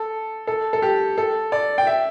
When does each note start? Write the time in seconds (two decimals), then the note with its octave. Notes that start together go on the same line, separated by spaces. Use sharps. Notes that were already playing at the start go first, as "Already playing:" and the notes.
Already playing: A4
0.47 A4
0.73 A4
0.82 G4
1.18 A4
1.52 D5
1.78 G5
1.87 E5